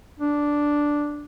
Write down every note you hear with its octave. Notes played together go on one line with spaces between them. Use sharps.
D4